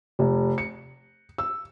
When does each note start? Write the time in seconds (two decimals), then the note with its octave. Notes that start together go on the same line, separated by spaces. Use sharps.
0.19 F1
0.58 C#7
1.38 E6